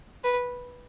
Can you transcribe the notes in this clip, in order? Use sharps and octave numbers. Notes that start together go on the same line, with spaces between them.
B4